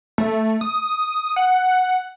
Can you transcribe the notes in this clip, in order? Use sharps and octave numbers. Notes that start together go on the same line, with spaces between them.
A3
D#6
F#5